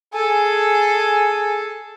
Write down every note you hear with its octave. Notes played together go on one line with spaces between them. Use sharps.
G#4 A4 G#5